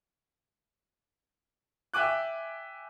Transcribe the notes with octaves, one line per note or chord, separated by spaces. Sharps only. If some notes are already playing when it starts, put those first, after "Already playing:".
E5 G5 G#5 D6 F#6